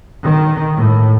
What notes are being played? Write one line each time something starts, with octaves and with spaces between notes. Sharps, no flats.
D#3
A2